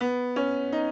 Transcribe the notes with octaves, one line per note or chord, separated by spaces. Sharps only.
B3
C#4
D#4